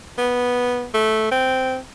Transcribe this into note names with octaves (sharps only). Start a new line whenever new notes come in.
B3
A3
C4